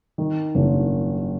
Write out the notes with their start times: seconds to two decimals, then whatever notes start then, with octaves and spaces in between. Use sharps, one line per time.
0.18 D#3
0.55 F#1